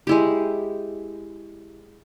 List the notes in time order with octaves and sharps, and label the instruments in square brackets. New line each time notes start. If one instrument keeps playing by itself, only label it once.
[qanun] G#3 E4 G4